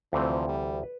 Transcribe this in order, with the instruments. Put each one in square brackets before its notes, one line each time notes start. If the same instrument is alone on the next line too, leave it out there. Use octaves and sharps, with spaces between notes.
[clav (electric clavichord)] D2 C3 E3 A3 C4 [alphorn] F3
[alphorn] G3
[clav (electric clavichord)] B4